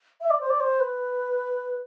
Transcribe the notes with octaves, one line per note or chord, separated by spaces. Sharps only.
E5
D5
C5
D5
C5
B4